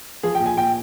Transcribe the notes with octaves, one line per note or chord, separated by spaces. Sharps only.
F3 G#4
G5
A#2
G#5
A#2 G5